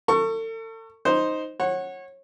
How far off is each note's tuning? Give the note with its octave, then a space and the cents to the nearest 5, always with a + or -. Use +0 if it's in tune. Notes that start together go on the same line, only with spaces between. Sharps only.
A4 +40 C#6 -5
D#4 +0 C5 +0
C#5 -25 F#5 +0